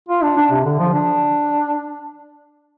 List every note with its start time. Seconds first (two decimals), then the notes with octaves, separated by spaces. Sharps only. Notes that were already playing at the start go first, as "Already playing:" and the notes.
0.09 F4
0.22 D4
0.37 D4
0.51 C3
0.65 D3
0.80 F3
0.94 D4